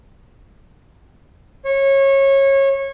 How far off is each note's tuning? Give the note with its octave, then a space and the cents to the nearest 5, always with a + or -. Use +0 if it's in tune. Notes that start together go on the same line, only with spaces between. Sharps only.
C#5 -25